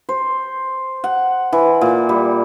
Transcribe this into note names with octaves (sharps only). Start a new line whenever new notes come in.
C5
F#5
E3
A#2
G3